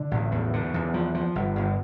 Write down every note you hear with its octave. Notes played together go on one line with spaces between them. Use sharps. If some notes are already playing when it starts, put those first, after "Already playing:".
Already playing: D3
A1
E2
D3
E2
F3
F3
G1
G1